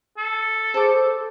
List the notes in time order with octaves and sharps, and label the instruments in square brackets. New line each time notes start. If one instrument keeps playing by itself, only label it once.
[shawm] A4
[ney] G#4 [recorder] C5 [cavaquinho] A5 D6
[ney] A4